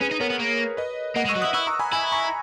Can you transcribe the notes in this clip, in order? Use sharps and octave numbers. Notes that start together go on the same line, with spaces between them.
C#4 G#4 B4
D#4
B3 A#4 C#5
B3
A#3
B4 D#5
A#3 D#5 F#5
G#3
C#6 E6
F#3
E4 D#6 F#6
E4 C#6 E6
A#5 C#6
G#5 B5
E4 G#5 B5
A#5 C#6